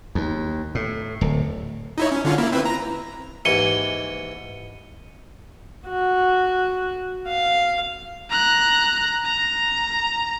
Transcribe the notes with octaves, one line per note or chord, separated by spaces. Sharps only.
D#2
A2
D1
D#4 E4 C#5
C#4
D3 C#4 F4
A#3 E4
C4 E4 B4
A#5
D#2 G#2 E3 C#7 D#7 G7
F#4
F5
A#5 F#6
A#5